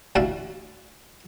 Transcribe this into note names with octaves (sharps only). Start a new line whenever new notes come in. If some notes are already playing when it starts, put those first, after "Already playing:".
A1 D2 F#4 D5 E5 F5